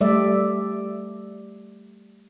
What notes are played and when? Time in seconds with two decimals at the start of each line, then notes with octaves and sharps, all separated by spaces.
0.01 G3 A3 D5 E5